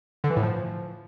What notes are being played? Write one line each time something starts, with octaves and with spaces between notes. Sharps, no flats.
D3
E3
A2
F3